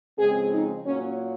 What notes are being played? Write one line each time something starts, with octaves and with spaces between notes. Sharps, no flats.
F2 C#3 G#3 C4 G#4
D#4
A#2 F#3 A#3 C#4